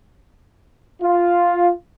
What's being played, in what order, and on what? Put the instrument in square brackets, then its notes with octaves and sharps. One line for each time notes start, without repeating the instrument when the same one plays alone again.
[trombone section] F4